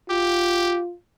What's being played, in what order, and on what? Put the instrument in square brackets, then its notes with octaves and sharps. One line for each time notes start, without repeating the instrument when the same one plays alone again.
[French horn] F4 [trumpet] G4